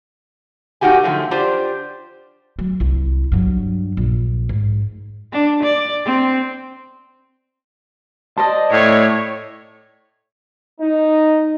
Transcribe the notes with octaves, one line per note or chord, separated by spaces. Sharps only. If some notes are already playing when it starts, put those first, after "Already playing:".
A#2 A#3 D#4 F#4 G4 G#5
D3 F3 F#3 A3
D4 F4 G4 C5 D5
F#3
C2 E4
G2 F#3
A#1
G#2
D4
D5
C4
C5 D5 D#5 A5
A2 C#5
D#4